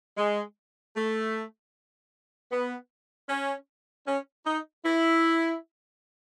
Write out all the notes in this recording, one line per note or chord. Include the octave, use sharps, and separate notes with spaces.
G#3
A3
B3
C#4
C#4
D#4
E4